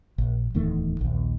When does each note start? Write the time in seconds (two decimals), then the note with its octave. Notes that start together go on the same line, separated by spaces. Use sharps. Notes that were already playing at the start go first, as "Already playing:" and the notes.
0.18 A#1
0.54 D1 E2 D#3 A3
1.01 A#1 D#2